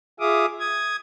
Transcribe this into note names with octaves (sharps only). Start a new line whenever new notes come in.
F4 G#4 E5 F5 D6 D#6
D#6 G#6